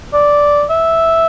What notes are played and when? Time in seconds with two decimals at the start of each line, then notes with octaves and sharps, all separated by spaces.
0.13 D5
0.70 E5